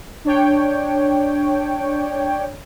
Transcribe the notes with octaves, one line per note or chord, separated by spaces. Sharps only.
D4 C#5 G5